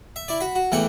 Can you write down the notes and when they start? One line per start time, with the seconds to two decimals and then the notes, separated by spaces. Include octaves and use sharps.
0.16 E5
0.28 E4 D5
0.40 F#4 B5
0.55 F#4
0.72 E2 A2 E3 A#3 F#5 G5